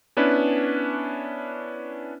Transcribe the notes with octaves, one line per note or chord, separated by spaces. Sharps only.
B3 C#4 D4 E4 B4